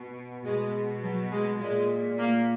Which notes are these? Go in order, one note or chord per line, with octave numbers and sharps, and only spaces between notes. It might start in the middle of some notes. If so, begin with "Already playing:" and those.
Already playing: B2
B2 G#3
F#3
G#3
A#2 G#3
A#3